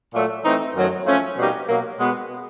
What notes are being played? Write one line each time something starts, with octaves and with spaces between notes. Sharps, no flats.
A#2 F#3 A3
E3 A3 C4 D#4
F#2 D#3 F#3 A3 C4
F3 A3 C#4
B2 G3 A#3 D#4 G4
B2 F#3 A#3
B2 G#3 B3